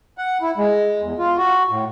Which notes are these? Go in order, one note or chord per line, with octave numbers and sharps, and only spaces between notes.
F#5
E4
G#3
E2
F4
F#4
A2